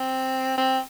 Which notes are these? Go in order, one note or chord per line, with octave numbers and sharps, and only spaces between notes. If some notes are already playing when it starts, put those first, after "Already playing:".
Already playing: C4
C4